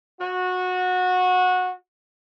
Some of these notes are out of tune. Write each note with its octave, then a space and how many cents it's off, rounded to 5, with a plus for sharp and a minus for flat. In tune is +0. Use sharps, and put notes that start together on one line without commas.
F#4 -20